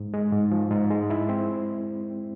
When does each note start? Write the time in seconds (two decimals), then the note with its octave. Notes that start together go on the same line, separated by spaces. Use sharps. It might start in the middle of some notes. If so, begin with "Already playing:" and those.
Already playing: G#2
0.14 G#3
0.32 G#2
0.52 F3
0.71 G#2
0.91 G#3
1.10 E4
1.29 C4